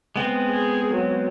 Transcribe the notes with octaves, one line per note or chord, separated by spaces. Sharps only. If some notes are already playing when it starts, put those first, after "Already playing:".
G#3 B3 C4
G#4
F#3